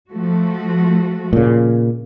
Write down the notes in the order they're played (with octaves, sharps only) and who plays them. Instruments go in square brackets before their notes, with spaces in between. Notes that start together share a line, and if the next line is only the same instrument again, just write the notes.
[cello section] F3 A3 F#4
[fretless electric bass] A#2 C#3